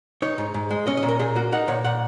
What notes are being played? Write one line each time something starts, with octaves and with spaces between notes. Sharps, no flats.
D#4 C#5
G#2
G#2
G#3
C#4 D#5
D#5
A#2
A#4
A#2 G#4
A#3 F#4
D#4 F#5
A#2 C#5
A#2 F#5